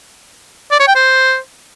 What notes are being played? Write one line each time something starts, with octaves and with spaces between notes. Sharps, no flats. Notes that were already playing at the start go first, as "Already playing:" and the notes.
D5
C#5
G5
C5